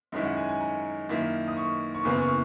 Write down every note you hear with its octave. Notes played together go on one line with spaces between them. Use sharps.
F#2 D#3 G#3 C#4 E4
F#5
G#5
G#5
A#5
F#2 D#3 A#3 E4
D#6
C#6
C#6
F#1 E2 C#3 E3 A#3 D#6
C#6